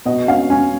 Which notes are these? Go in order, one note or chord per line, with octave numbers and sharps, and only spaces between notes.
B2 D#5
C#4 F5
C#4 G#5